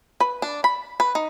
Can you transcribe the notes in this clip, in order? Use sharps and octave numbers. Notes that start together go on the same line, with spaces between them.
B4
D4
B5
B4
D#4